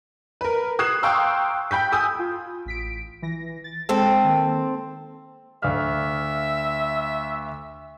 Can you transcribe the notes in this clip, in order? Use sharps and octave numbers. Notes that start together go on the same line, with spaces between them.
A#4 B4
D#6 F#6 G#6 C7 E7
F5 G5 A#5 C6 C#6 E6
G5 B5 G6 B6
G#5 D#6 E6 G6
F4
A1 B6 D7
E3 A#6
A6
G#3 C4 A4
D#3 A#3
D2 E5 F5 F6